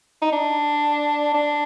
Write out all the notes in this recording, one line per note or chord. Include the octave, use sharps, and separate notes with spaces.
D#4
D4
D4